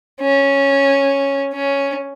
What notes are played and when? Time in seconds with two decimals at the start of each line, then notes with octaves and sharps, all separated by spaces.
0.21 C#4
1.53 C#4